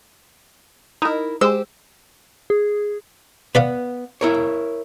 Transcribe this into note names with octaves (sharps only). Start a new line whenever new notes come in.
D#4 E4 A#4
G#3 G4 C5 E6
G#4
B3 B4 D5 F5
E4 A#4 C#5